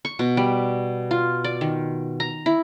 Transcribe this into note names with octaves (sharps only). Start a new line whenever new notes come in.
C#6
B2
G3
F4
D5
D#3
A#5
E4